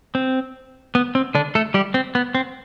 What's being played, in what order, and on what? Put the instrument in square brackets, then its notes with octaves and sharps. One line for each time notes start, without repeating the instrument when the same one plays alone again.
[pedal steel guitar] C4
B3
C4
D3 D4
A3 A4
G3 G4
C4
B3
C4